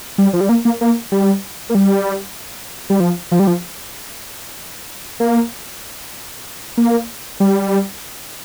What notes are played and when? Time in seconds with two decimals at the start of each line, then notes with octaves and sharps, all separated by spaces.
0.18 G3
0.33 F3
0.41 G3
0.49 A#3
0.65 A#3
0.81 A#3
1.12 G3
1.70 A#3
1.75 G3
2.90 G3
3.00 F3
3.32 F3
3.40 G3
3.47 F3
5.20 A#3
6.77 A#3
7.40 G3